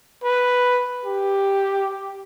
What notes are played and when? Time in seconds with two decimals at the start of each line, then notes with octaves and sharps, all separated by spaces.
0.24 B4
1.05 G4